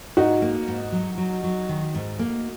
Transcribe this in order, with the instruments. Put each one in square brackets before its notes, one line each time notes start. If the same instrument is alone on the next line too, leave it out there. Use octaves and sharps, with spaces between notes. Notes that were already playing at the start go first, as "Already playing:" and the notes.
[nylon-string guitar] G#2 [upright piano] D#4 F#4
[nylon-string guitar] A#3
G#2
F#3
F#3
F#3
D#3
G#2
A#3